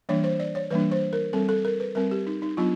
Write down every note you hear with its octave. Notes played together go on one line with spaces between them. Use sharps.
E3 G3 A#3 D4 C#5
C5
D5
C#5
E3 G3 A#3 D4 B4
C5
A#4
G3 C4 A4
A4
A#4
B4
G3 C4 A#4
G4
D#4
D#4
F#3 B3 D4 F4